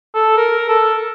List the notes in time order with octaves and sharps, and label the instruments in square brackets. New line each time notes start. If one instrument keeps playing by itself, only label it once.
[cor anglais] A4
A#4
A4